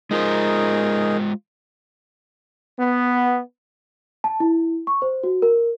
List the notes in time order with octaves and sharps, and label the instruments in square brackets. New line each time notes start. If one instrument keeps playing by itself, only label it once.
[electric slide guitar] G#3 F4 C5 [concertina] D#4 G#4 A#4
[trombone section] B3
[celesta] A5
E4
C#6
C5
F#4
A#4